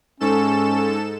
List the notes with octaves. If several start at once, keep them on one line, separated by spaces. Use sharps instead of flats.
G#2 C#4 A4 E7